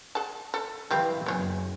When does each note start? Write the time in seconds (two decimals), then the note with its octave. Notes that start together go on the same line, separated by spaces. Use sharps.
0.15 G#4 F#5 A5
0.54 A4
0.91 E3 G3 C4 F5
1.26 F#1 B3 C5 G#5